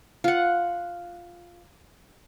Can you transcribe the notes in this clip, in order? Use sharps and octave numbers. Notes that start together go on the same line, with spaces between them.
F4 F#5